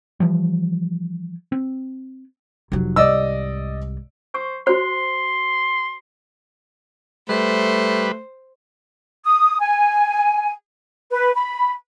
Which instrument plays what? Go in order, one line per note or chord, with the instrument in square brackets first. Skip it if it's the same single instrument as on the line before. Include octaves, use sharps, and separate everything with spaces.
[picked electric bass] E3 F3 G3
C4
[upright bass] F1 F#3
[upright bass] C2 G#2 [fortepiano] D5 D#5 E6
[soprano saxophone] C5 [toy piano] C#6
[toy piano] F#4 C5 [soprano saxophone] C6
[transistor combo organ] G3 B4 [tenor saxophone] A3 [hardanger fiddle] C5
[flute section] D#6
G#5
B4
B5